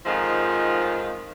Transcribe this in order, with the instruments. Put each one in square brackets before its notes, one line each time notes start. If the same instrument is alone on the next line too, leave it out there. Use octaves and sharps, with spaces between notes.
[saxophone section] F2 G#2 D#3 F3 F4 D#5